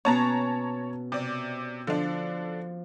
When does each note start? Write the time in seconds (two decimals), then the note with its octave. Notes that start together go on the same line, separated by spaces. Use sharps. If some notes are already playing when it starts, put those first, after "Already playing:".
0.05 B2 B3 C#4 C#5 A5 A#5
1.12 C3 D5
1.87 D3 F3 D4